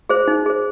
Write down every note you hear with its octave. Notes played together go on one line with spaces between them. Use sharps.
G#4 C5
D#4
G#4 C5